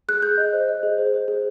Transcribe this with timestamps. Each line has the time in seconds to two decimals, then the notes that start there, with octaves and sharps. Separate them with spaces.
0.09 G#4 F#6
0.22 G#4 G6
0.38 D#5
0.53 C5
0.69 D#5
0.83 G#4
0.98 C5
1.14 C5
1.28 G#4